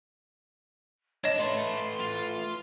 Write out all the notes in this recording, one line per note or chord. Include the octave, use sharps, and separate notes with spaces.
D4 C#5 D#5 E7
A3 B4 E5 A5 C6
F4